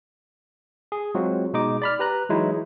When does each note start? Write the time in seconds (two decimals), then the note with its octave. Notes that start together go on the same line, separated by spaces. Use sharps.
0.92 G#4
1.15 F#3 G#3 C4 F4 F#4
1.53 B2 G#3 D#4 D#5 D6
1.82 D5 B5 F6
1.99 G4 B4 A#5 F#6
2.29 E3 F#3 G#3 D#4 E4 F#4